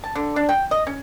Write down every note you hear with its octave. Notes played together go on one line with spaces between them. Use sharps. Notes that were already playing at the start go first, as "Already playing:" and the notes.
A5
D3
D4
G5
D#5
C#4